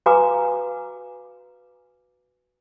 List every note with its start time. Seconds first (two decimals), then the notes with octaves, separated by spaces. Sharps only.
0.06 F#4 B4 F5 G#5 A#5 D6